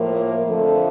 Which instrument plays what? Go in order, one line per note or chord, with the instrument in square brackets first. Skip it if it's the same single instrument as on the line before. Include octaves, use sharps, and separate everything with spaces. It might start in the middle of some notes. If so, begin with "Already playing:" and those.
Already playing: [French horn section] A2 F3 A#3
F2 D3 F3 A3 A4